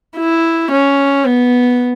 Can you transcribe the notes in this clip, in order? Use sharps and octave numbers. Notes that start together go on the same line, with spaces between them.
E4
C#4
B3